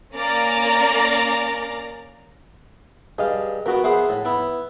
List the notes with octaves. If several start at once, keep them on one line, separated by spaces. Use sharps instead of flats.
A#3 C#4 A#4 D5 A#5
G2 G#4 D#5 F5
B2 B3 F#4 A#4
B3 G#4 C5 E5 F#5
A2
B3 E4